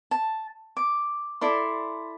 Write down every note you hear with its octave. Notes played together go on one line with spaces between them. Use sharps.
A5
D6
E4 A4 D5 C6